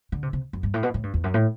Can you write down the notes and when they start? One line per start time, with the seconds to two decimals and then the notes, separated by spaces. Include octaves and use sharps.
0.12 D3
0.23 C3
0.33 C3
0.53 F#2
0.63 G2
0.74 A2
0.83 B2
0.94 A2
1.03 G2
1.14 E2
1.24 F#2
1.34 A2